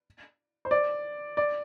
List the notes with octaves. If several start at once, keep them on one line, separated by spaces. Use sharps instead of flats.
C5
D5
D5